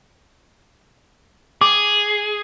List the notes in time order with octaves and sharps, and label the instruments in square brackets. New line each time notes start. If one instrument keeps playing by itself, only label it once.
[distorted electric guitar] G#4 [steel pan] D6